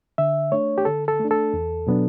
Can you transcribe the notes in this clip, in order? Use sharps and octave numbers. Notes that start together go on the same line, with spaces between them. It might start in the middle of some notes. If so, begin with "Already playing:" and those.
D3 E5
A3 D4 C#5
G4
D3 A4
A4
A3 D4
A4
E2
B2 F#3 B3 D4